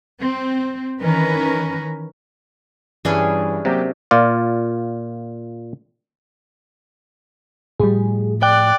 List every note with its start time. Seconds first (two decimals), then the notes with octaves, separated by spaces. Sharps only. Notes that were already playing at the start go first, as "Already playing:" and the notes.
0.20 C4
0.99 D#3 E3 C#4 A#4 B4
3.05 G2 E3 G3 C#4 D4 G#4
3.65 C3 F#3 A#3 G4
4.11 A#2 F4 D5
7.80 A2 F3 G3 G#4
8.43 D5 G5 F#6